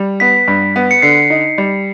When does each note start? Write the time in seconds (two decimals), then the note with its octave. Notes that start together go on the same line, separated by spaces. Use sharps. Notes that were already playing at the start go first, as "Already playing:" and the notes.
Already playing: G3
0.20 B3 B6
0.48 G2
0.76 B3
0.91 C#7
1.02 D3 C7
1.30 D#4
1.58 G3